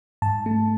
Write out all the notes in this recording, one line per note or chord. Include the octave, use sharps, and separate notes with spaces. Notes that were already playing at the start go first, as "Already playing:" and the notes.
G#2 A5
A3